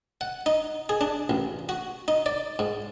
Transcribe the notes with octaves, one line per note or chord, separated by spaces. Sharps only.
F#5
D#4
G#4
D4
A1
F#4
D#4
D5
G#2